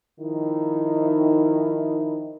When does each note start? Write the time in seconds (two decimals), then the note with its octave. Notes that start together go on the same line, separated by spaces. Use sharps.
0.20 D#3 F3 D#4 E4